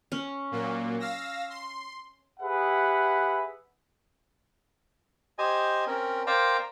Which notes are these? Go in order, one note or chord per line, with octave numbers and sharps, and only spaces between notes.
C#4
A#2 F#3 A#3
F5 E6 A#6
C6
G4 G#4 B4 E5 F#5
G4 C5 D#5 G#5
C4 C#4 A#4
A#4 C5 D5 F5 G5 A#5